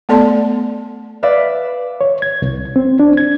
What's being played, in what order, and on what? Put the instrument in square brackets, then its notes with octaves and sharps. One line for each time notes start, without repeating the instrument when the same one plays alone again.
[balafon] A3 B3 A4 D5 A5 C6
[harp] B4 D5 E5 F5
[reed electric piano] C#5
G#6
C2
C4
D4
G#6